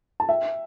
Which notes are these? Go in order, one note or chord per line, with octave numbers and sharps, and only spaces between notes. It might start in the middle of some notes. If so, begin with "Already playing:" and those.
A5
E5 G5